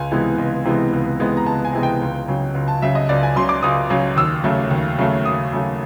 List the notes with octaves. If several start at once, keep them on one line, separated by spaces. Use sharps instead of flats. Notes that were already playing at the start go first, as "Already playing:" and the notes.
Already playing: C#2 G#5
C3 E3 G#3 B3
C#2
C3 E3 G#3 B3
C#2
C3 E3 G#3 B3
A#5
C#2 A5
G#5
C3 E3 G#3 B3
G5
C#2
C#3 F#3
C#2
A5
C#3 F#3 E5
D#5
C#2 D5
G#5
C#3 F#3 C6
D6
C#2 D#6
C#3 F#3
D#2 E6
C#3 F#3 A3
D#2
C#3 F#3 A3
D#2 D#6
C#3 F#3 A3